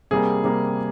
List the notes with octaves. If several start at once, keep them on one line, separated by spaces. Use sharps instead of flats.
C3 G3 A#3 G#4
C3 G3 A#3